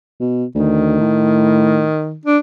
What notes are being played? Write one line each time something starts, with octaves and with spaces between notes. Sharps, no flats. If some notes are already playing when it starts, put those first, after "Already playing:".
B2
D2 D#3
A2
D4